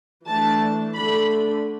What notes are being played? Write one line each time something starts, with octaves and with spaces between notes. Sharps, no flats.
E3 A3 D4 A5
D3 A3 D4 B5